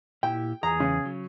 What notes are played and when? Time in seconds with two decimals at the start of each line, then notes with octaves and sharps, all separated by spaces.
0.23 A#2 E4 G4 G5
0.63 E2 G#4 A#5
0.80 C#3
1.05 F#3